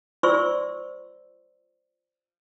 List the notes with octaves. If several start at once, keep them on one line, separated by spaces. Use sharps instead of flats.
F4 C5 D5 C6 C#6 E6